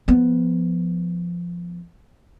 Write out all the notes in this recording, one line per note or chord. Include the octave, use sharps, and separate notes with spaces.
F3 B3